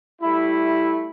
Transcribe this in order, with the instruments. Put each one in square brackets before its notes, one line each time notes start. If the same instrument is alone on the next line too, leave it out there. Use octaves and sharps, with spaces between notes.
[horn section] G3 A3 E4